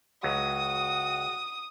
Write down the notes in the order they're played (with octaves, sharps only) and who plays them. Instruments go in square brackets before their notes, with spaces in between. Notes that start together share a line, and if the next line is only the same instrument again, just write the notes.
[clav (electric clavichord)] C#2 F#3 [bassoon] F#4 [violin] D#6